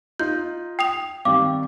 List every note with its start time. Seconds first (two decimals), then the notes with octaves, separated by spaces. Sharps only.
0.20 D#4 F4 G6
0.79 G5 D#6 F7
1.25 D#3 G3 C4 F5 D6